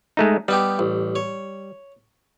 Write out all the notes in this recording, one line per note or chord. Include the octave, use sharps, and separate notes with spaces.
G#3 A3 D#4
G3 B3 D#4 G4
A1
C#5